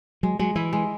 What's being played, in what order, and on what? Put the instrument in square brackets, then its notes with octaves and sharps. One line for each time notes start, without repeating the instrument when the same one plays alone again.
[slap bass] F#3 [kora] G#3
[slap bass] F#3 [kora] G#3
[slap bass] E3 [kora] E4
[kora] G#3